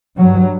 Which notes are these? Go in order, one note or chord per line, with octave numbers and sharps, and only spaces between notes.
G2 F#3